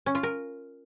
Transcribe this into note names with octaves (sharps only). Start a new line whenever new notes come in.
C#4
F4
A#4